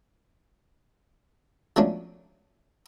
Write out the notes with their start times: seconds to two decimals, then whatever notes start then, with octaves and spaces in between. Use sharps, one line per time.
1.76 F3 F#3 A3 C#4 D4